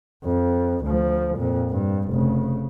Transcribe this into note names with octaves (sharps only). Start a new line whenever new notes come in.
F2
D2 F3
F2 A#2
G2
F1 C#3